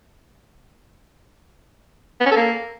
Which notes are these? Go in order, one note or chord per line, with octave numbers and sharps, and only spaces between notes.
B3
C#4
A4
A#3